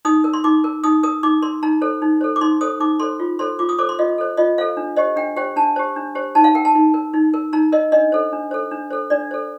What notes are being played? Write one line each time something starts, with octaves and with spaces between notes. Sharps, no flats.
D#4 D#6
A#4
C6
D#4 D6
A#4
D#4 D#6
A#4 D#6
D#4 D6
A#4 C6
D#4 A#5
A4 C5
D#4
A4 C5
D6
D#4 C6
A4 C5 D#6
D#4 D6
A4 C5 C6
F4
A4 C5 C6
F4 D6
D#6
A4 C5 D6
C6
F4 D#5
A4 C5
F4 D#5
A4 C5 F5
D4
G4 C5 D#5
D4 G5
G4 C5 G5
D4 A5
G4 C5
D4
G4 C5
D#4 A5
F5
A#4 G5
A5
D#4
A#4
D#4
A#4
D#4 A#5
A#4 D#5
D4 D#5
A4 C5
D4
A4 C5
D4
A4 C5
D4 D5
A4 C5